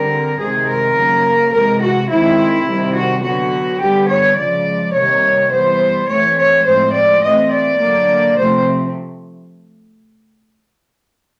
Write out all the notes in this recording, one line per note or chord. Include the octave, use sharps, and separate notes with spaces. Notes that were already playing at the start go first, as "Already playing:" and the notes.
Already playing: D3 G3 C4 A#4
C3 D#3 G#3 C4 G#4
A#4
C#3 F#3 A#3
C3 E3 G#3 A#4
F#4
D#3 G#3 C4 E4
C3 D#3 G3 C4
F#4
D3 F#3 B3 F#4
D3 G3 B3 G4
C#5
C#3 F3 G#3 D5
C3 D#3 G3 A#3 C#5
E3 G3 B3 C5
E3 A3 C4 C#5
C#5
A2 F3 G#3 C4 C5
D5
E3 A3 C4 D#5
D5
D3 F#3 A#3
C3 F3 A3 C4 C5